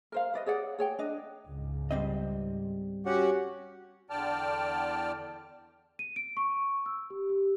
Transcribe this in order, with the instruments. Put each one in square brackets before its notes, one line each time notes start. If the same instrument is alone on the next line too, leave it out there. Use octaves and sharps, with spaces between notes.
[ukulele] A#4 C5 F5
B4 D5 D#5
G#4 C#5 D5 F#5
G#4 C#5 G5
D4 D#5
[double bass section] C#2 G#2
[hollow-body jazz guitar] G3 C4 D#5
[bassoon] C#4 [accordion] F#4 G4 F#5
[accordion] E2 D3 D5 G5 A5 F6
[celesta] D#7
D7
C#6
E6
G4
G4